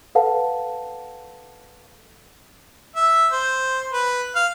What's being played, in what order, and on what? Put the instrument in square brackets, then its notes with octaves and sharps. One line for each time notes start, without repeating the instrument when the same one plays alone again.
[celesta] A4 B4 F5 F#5 A5
[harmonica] E5
C5
B4
F5